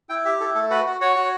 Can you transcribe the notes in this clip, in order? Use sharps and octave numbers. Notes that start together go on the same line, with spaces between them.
E4 G5
G4 E5
E4 A4
A3 A4
F#4 B4
F#4
F#4 C#5
F#4